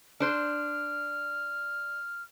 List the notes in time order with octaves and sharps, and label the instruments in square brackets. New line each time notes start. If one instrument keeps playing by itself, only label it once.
[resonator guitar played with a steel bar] D4 C5 [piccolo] F6